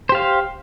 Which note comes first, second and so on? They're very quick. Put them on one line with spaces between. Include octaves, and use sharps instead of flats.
C5 G4 F5